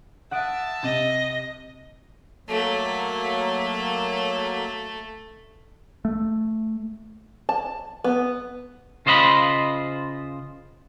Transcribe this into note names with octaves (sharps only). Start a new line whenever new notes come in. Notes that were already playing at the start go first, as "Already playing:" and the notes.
E5 F#5 A5 D#6 D7
C3 D#5
F#3 A3 A#3
A3
A5
B3
C#3 F4 C5 D#5 E5 B5